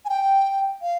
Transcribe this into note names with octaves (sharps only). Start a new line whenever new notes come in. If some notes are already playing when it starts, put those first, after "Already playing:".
G#5
G5
F5